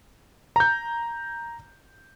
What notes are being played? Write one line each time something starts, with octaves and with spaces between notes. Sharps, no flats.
A#5 G6